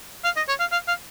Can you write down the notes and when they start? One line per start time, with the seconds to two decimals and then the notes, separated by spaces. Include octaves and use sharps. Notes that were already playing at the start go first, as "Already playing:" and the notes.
0.24 F5
0.37 D#5
0.49 C#5
0.60 F5
0.72 F5
0.88 F5